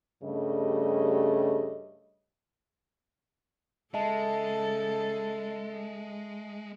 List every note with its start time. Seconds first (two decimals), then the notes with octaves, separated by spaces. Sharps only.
0.23 G2 C#3 G3 A3 D#5
3.94 C#3 G#3 A4 D#5 E5 A5